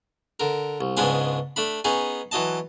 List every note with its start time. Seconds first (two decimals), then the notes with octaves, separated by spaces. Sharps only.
0.40 D3 A#4
0.81 C2
0.97 C#2 G#2 G#3 B3 D4 G#5
1.56 A3 D4 B5
1.84 B3 C#4 D#4 G#4
2.31 E3 F#3 D#5 A5